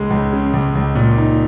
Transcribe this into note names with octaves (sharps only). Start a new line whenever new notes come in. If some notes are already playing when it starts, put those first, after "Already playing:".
Already playing: C#2 G#3
C#2
C#3
C#2
C#2
A#2
D#4